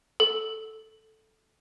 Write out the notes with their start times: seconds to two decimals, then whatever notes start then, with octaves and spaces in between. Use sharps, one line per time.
0.20 A4